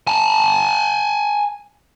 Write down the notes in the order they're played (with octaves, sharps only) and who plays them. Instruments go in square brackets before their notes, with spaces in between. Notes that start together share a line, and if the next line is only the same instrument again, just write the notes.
[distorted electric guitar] G#5 A5